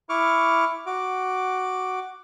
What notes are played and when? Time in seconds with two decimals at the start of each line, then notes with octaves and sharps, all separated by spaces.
0.09 E4 C#6 D6 F6
0.86 F#4 D6